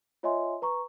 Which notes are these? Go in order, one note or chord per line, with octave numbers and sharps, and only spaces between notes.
F4 C#5 D#5 E5 G#5 C6
B4 A#5 C#6